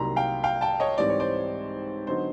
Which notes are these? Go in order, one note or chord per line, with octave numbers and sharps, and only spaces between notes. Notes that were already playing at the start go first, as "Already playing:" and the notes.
Already playing: C2 C3 D#3 F#3 A#3 A#5 C6
F5 G5
F5 G5
G5 A5
C#5 D#5
G#2 E3 G3 C4 D5
C#5
C5 D5
D3 F#3 B3 D#4 C5